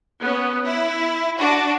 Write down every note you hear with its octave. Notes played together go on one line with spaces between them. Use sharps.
B3 C#4
E4
D4 F#4